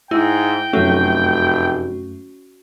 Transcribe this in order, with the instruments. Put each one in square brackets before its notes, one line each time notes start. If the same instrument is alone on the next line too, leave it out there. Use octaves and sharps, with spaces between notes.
[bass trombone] G#2 [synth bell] E4 [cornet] G5
[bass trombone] F1 [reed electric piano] F#2 A3 [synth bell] C#4 F#4